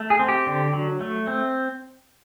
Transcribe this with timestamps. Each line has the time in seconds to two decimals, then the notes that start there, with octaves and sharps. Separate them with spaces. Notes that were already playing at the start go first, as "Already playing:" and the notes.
Already playing: A3
0.10 G#4
0.19 C4
0.28 G4
0.47 D3
0.73 F#3
1.01 A3
1.27 C4